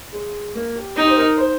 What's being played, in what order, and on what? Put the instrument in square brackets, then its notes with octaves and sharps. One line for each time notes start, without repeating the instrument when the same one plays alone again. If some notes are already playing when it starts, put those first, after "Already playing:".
[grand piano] G#3
A#3
G4
[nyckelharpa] D#4 [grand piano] G4
[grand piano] C5
A#4
C5